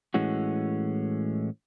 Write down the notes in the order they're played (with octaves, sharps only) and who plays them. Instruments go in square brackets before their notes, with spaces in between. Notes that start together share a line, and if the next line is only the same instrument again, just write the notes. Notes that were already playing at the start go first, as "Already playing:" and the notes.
[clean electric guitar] A2 E3 G#3 C#4 F#4